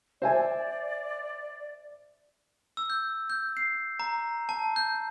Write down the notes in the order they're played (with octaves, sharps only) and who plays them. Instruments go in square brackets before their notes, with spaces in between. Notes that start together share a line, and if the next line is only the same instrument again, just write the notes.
[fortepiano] C5 E5 G#5 [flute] D5
[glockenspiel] E6
G6
G6
C7
A#5
A5
G6